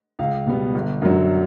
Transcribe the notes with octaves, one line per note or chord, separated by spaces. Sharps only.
C#2 F5
B2 G3 B3
G1
F#2 D3 F#3